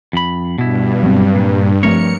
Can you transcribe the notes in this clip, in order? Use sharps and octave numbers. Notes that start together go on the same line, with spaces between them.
F2 B5
G2 B2 E4
F#3 C4
A#2
F3 A3 C4 A#4 C#5 C#7